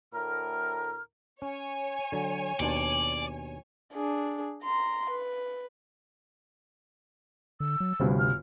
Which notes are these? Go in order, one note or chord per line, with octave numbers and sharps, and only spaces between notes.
D2 A2 A#4 F6
C#4 C#5 G#5
D3 F#3
D#2 B2 D4 D5
D4 G#4
A#5 C6
B4
D3 E6
F#3
G1 D2 G2 C3
F6